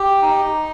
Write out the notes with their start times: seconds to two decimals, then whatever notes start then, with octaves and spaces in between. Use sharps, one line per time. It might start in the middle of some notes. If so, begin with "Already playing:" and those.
Already playing: G4
0.22 D#4